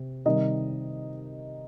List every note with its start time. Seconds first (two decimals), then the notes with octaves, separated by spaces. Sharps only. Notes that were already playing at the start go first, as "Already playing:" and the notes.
Already playing: C3
0.25 C3 D#3 G3 D#4 D#5